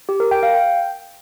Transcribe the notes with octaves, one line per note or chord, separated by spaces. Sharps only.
G4
A#4
G5
F5
G5